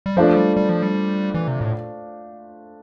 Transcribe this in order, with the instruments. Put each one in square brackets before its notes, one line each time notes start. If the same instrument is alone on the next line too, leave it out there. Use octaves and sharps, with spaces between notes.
[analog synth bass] G3
[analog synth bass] F3 [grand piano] A3 D4 F4 C5
[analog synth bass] G3
G3
F3
G3
E3
C3
A2